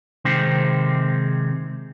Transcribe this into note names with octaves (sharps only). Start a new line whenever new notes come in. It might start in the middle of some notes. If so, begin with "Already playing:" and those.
C3 D#3 G#3 C4